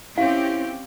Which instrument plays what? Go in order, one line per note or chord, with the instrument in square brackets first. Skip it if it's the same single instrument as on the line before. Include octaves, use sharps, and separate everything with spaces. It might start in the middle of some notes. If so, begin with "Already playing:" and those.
[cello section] C4 C#4 G4 [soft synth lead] E4 [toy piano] F5